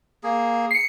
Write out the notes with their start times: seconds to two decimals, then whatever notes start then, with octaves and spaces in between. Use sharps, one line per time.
0.24 A#3 G#4
0.71 C7 C#7